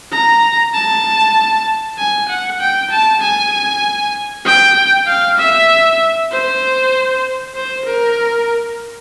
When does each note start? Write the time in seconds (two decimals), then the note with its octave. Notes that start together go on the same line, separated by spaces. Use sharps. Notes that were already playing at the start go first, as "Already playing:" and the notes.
0.12 A#5
0.74 A5
1.98 G#5
2.29 F#5
2.60 G5
2.91 A5
3.22 G#5
4.45 G5
5.07 F5
5.38 E5
6.31 C5
7.55 C5
7.85 A#4